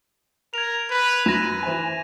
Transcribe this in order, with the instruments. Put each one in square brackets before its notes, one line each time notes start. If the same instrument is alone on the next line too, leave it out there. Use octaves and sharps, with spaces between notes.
[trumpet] A#4 [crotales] G#6 F7
[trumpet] B4
[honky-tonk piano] F#2 [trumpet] B4 [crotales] A#6 D#7 E7
[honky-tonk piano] E3 C5 G#5